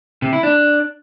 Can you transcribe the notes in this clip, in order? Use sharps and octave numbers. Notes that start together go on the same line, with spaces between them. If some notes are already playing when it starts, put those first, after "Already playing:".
C3
E4
D4